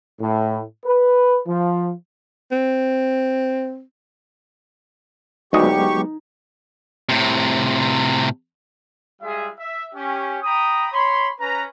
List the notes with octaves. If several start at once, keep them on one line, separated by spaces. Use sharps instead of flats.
A2
B4
F3
C4
D2 F#3 G#3 B3 D#4 G4 D#5 C#6
A2 C3
G3 G#3 F4 G#4 D#5 E5
E5
C#4 G4
G5 A#5 B5 D#6
C#5 B5 C6
C#4 B4 A#5